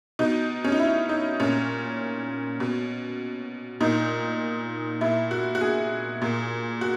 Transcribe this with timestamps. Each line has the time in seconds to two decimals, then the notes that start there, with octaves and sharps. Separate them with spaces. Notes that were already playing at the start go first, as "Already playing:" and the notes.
0.19 B2 D#4
0.64 C#4
0.72 D#4
0.79 E4
1.09 D#4
1.40 A#2 C#4
2.60 B2
3.81 A#2 D#4
5.01 A#2 E4
5.31 F#4
5.55 F#4
5.61 G#4
6.22 A#2
6.81 F#4